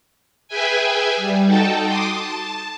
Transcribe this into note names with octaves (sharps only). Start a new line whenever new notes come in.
G#4 B4 E5 G5 G#5
G3
D#4 F#4 A4 G5 A5
C6 D6 D#6
A5